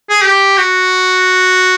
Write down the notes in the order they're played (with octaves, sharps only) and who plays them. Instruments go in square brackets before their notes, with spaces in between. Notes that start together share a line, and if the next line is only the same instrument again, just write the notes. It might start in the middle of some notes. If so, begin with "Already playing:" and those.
[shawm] G#4
G4
F#4